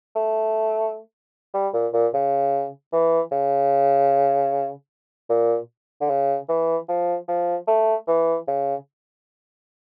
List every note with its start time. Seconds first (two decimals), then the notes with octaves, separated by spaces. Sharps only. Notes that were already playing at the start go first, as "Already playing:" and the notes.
0.15 A3
1.54 G3
1.73 A#2
1.93 A#2
2.13 C#3
2.92 E3
3.32 C#3
5.30 A#2
6.01 D3
6.09 C#3
6.49 E3
6.88 F3
7.28 F3
7.67 A3
8.08 E3
8.47 C#3